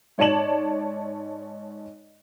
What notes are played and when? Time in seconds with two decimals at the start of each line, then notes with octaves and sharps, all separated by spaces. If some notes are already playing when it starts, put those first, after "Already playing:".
0.18 G#2 C#5 D5 A5 E7 F#7